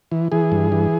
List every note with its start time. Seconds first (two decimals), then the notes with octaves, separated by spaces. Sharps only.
0.12 E3
0.32 E3 G#4
0.52 G2
0.72 E3